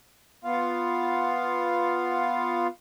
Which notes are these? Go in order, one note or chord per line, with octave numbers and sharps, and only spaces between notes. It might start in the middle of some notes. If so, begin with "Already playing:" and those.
B3 F4 F5